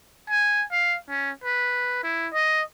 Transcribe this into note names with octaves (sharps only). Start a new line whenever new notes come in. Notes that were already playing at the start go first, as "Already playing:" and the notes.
G#5
F5
C#4
B4
E4
D#5